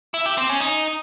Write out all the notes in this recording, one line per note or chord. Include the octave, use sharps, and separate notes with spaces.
E4
G4
C4
C#4
D#4